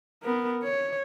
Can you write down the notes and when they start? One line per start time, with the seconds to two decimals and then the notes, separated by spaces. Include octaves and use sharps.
0.23 B3 A#4
0.63 C#5